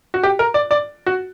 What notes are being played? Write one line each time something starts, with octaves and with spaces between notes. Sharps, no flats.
F#4
G4
A#4
D5
D5
F#4